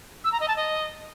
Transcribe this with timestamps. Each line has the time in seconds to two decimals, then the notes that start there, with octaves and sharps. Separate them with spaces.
0.24 E6
0.32 A#5
0.40 D#5
0.48 A5
0.56 D#5